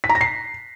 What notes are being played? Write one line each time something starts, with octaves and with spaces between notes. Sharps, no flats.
B6
A#5
A#6
C7